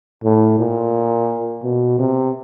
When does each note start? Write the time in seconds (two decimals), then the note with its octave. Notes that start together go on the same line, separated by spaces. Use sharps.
0.24 A2
0.59 A#2
1.63 B2
1.99 C3